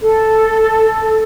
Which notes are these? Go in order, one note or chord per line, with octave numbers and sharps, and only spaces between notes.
A4